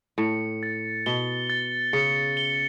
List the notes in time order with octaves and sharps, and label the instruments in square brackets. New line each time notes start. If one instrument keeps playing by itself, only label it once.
[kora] A2 [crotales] C#7
[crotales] A6
[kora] B2 [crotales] G7
[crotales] A6
[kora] C#3 [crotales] C#7
[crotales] G7